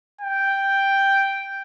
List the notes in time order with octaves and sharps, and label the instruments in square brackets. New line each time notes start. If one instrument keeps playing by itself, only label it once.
[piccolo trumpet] G5